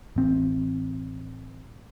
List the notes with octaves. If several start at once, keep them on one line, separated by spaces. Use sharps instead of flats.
A1 C4